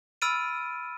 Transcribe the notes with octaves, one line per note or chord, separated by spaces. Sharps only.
B5 E6 F6 A6 D7 D#7